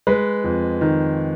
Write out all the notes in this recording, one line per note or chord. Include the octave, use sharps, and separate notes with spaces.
G#3 B4
F2
D#3